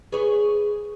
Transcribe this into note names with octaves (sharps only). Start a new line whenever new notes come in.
G#4 B4 C#5